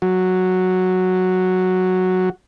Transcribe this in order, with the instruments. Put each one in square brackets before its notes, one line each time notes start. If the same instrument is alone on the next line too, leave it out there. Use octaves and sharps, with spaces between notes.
[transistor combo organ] F#3 F#4